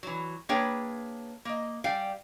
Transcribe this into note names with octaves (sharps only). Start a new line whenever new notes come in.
E3 F#3
A#3 D4 G#4 B4 C#5 G5
A#3 D#5
G3 F5 G5 G#5